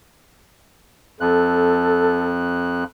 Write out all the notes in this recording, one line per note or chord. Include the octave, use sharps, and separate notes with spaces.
F2 A4 F#6